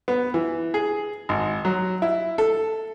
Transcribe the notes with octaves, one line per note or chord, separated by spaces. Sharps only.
B3
E3
G#4
G#1
F#3
E4
A4